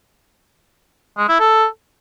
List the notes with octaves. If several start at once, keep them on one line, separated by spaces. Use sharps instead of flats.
G#3
E4
A4